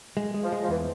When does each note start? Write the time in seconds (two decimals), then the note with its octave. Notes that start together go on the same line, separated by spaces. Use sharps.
0.17 G#3
0.34 G#3
0.43 F3
0.52 G#3
0.62 F3
0.69 E2 E3